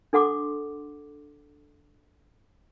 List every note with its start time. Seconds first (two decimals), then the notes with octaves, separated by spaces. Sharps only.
0.13 D4 A4 F#5 C6 D6